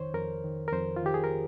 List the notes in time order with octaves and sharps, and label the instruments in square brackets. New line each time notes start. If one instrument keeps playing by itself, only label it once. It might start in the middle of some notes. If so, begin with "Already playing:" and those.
Already playing: [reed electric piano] F2 D#3 C5 C#5
F2 A#4
D#3
A#4
F2 C5
F4
D#3 G4
G#4
A#4